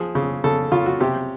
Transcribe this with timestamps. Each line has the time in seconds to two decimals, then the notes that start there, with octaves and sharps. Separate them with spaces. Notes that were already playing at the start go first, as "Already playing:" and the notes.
Already playing: F3 G#4
0.15 C#3
0.44 C#3 A4
0.72 C#3 F4
0.86 F#4
1.00 C3 G4